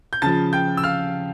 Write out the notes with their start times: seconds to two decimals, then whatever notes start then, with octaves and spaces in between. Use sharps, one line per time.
0.13 G6
0.22 C#3 F3 A5 A6
0.53 G5 G6
0.77 E6
0.84 F5 F6